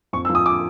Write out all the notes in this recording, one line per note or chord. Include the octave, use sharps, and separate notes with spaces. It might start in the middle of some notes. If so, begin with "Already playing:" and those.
F2 C#6
E6
F3
D#6
D6